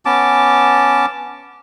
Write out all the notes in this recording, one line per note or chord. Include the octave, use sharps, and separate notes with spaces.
B3 C#4 A5 D6